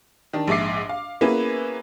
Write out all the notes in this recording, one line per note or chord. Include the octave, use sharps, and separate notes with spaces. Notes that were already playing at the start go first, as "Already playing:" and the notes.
D#3 D4
A#1 G#2 E5 D6 C7
F5
A#3 B3 C#4 E4 G#4 B4